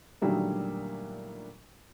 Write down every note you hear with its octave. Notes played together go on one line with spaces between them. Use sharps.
A#2 D3 D#3 F#3 G3 A3